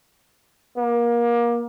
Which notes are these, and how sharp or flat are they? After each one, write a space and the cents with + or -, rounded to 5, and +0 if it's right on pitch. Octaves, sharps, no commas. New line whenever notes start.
A#3 +25